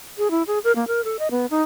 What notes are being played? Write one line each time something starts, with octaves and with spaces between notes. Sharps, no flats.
G#4
E4
G#4
A#4
A#3
A#4
A4
D#5
B3
D#4